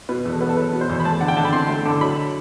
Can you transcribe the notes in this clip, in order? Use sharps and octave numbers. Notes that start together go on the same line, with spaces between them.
B2 B4
E2
A4
B3 B4
A4
F#3 B4
B2
C5
E2
B5
A3 A5
D3 F#5
G5
D3 A5
B5
C4 C6
A3
D3
F#3 B5